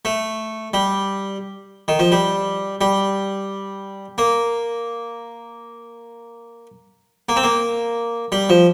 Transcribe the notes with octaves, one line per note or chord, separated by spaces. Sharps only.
A3
G3
D#3
F3
G3
G3
A#3
A#3
C4
A#3
G3
F3